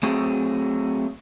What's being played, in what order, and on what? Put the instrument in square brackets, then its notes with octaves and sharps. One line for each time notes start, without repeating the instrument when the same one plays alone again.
[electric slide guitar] F#3 A3 C4 G#4